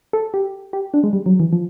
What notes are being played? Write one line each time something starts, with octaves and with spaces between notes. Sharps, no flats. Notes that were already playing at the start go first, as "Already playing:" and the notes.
A4
G4
G4
D4
G#3
G3
F#3
E3
F3